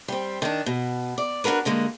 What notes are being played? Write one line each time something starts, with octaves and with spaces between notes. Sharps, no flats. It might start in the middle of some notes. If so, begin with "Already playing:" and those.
G3 C4
D#3 D4
B2
D5
D4 F4 F#4 A#4 B4
G2 D3 G#3 A#3